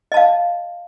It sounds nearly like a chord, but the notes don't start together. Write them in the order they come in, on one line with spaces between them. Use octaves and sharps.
D#5 A5 F5